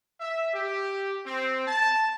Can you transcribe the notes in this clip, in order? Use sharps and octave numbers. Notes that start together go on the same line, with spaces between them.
E5
G4
C4
A5